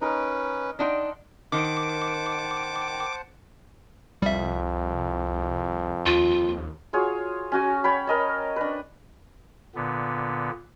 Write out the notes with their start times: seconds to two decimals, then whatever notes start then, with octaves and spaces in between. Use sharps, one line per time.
0.01 C#4 D#4 A#4 B4
0.79 D4 D#4 D#5 F#5 G5 C6
1.52 D#3 C5 F#5 A5 D6
4.22 C2 F2 G3 E5
6.06 D#2 F4
6.93 F4 F#4 G#4 C#5
7.52 C#4 F#4 G#5
7.84 C#5 G5 B5
8.07 A#4 D#5 A5
8.56 D4 B4
9.75 A#2 D3 B3